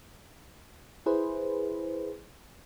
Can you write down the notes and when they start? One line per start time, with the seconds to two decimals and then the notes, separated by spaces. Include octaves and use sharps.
1.06 E4 G#4 B4 C5